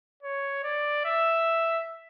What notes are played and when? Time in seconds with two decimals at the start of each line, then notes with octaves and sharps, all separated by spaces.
0.23 C#5
0.64 D5
1.05 E5